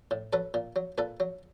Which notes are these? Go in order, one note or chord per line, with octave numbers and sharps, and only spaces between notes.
A2
F#3 A4 B4
A#2
F#3
A#2 A4 B4
F#3